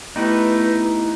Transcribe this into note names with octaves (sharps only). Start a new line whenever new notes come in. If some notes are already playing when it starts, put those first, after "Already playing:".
A3 B3 D#4 E4 G4 B4